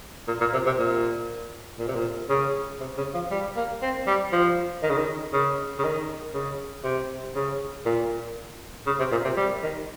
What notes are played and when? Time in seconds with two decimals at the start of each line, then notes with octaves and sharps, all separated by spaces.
0.27 A#2
0.40 A#2
0.53 C3
0.66 C3
0.78 A#2
1.79 A#2
1.88 C3
1.95 A#2
2.30 C#3
2.80 C3
2.97 C#3
3.14 F3
3.31 G3
3.56 A#3
3.82 C4
4.07 G3
4.32 F3
4.83 D#3
4.90 C#3
4.98 D#3
5.33 C#3
5.79 C#3
5.84 D#3
6.34 C#3
6.84 C3
7.35 C#3
7.86 A#2
8.86 C#3
8.99 C3
9.11 A#2
9.24 C3
9.37 G3
9.63 D#3